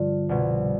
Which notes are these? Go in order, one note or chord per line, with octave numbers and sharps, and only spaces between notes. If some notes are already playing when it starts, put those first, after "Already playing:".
Already playing: G2 D3 F3 F4
C2 B2